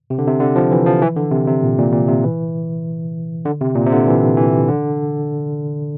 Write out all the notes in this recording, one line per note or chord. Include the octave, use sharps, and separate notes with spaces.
C3
D3
C3
D3
F3
E3
F3
E3
D3
C3
C3
A#2
A#2
A#2
C3
E3
D3
C3
A#2
C3
D3
E3
E3
D3